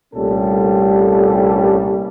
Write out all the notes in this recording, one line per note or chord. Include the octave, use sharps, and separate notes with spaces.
C2 A#2 G3 A3 C#4 A4